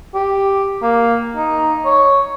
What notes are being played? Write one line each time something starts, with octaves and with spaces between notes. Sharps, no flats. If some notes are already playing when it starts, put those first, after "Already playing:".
G4
A#3
D#4
C#5